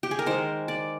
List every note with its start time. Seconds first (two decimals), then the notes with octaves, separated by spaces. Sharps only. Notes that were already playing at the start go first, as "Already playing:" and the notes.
0.03 G4
0.11 G#4
0.19 A#4
0.26 D#3 G#3 C5
0.68 D5